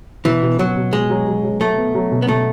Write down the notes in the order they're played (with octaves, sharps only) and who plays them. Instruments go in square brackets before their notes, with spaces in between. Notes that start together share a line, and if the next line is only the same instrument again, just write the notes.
[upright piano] B2 [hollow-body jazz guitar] E3
[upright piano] B2
[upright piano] B2 [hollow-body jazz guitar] F#3
[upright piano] B2
[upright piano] B2 [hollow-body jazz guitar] G#3
[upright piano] F#3
F#3
F#3
[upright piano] F#3 [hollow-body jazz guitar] A3
[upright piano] B3
F#3
B2
[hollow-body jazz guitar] B3
[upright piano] B2 [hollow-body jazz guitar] A3